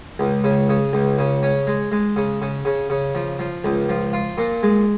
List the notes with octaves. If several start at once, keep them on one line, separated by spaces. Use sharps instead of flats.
C#2
C#3
C#3
C#2
C#3
C#4
G#3
G#3
C#3
C#3
C#3
C#3
F3
F3
C#2
F3
F4
A#2
G#3